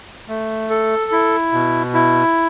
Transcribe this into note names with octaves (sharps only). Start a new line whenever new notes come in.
A3
A4
E4
B2
E4